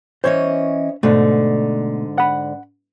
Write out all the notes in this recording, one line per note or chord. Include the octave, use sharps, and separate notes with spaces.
E3 C#4 C5 C#5 D#5
G#2 B2 D3 A3
F#5 B5